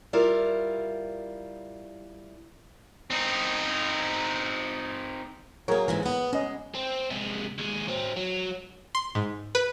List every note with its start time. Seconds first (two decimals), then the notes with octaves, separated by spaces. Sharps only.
0.13 G3 E4 F4 A#4
3.10 C4 D#4
5.68 F#3 A#3 G#4 A#4 C#5
5.88 G#2 C3 E3
6.03 B3 B4
6.33 G#3 C#4 D#5
6.75 C4
7.11 C3 G#3
7.58 D#2 G#3
7.88 F#3 C4
8.16 F#3
8.95 C6
9.15 G#2
9.55 B4